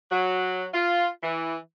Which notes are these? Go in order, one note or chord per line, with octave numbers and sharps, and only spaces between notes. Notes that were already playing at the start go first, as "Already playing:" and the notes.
F#3
F4
E3